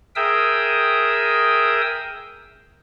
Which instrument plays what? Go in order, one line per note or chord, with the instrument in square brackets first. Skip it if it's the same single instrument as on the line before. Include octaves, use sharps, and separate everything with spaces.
[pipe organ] G#4 A#4 E5 G5 D#6 E6